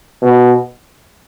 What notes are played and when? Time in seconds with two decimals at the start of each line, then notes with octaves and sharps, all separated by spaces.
0.22 B2